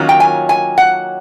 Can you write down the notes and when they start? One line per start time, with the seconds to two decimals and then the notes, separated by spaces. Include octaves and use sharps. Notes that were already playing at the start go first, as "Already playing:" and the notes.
Already playing: D#3 F#3 A#3 C#4 F4
0.09 G5
0.20 G#5
0.49 G#5
0.78 F#5